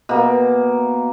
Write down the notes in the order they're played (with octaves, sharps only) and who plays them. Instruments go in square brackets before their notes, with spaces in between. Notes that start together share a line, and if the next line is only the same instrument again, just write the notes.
[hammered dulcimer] B2 A#3